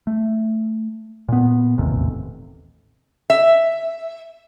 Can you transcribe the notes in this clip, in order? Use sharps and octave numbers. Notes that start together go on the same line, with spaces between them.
A3
A#2 B3
E1 A1 D#2 C3
E5